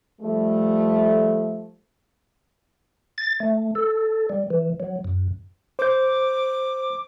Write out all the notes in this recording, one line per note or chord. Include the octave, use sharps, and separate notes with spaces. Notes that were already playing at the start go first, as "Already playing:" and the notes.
F3 G3 A3
A6
A3
A4
G3
E3
F#3
F#2
C5 D6 G6